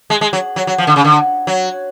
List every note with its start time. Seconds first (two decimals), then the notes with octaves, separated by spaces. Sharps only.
0.10 G#3
0.21 G#3
0.33 F#3
0.56 F#3
0.67 F#3
0.78 F3
0.87 D3
0.96 C#3
1.04 D3
1.47 F#3